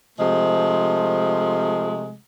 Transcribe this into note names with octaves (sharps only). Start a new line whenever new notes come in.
C3 F3 G#3 A3